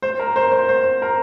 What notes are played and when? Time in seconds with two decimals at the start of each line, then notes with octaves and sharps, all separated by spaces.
0.02 C5
0.20 A#4
0.36 C5
0.52 C5
0.69 C5
1.02 A#4